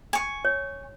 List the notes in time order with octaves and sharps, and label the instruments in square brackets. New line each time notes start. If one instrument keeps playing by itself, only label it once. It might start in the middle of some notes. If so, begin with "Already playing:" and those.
[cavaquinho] G#5 C#6
[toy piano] C#5